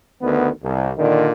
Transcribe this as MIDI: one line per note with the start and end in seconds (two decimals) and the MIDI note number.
0.22 0.49 38
0.22 0.49 51
0.22 0.49 59
0.64 0.92 36
0.98 1.31 46
0.98 1.31 50
0.98 1.31 51